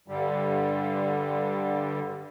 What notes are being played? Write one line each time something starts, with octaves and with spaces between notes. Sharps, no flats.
G2 D3 G3